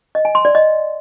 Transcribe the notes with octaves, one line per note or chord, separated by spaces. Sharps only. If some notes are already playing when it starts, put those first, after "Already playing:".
D#5
G#5
C6
D5
D#5